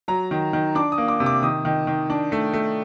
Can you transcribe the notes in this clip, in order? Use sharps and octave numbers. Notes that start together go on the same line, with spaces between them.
F#3 A#5
D#3
D#3
D4 D6
D#6
A#3
D6
C3
D6
D#3 D#6
D#3
D#3
D4
A3
A3